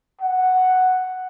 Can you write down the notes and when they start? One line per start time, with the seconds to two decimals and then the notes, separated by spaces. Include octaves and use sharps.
0.21 F#5